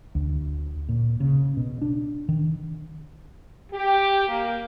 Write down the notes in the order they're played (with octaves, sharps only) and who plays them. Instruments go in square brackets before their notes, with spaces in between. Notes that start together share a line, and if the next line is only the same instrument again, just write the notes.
[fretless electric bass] D2
A#2
C#3
B2
D4
D#3
[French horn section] G4
A#3